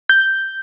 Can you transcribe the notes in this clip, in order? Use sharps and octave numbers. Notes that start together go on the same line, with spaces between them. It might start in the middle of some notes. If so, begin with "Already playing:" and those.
G6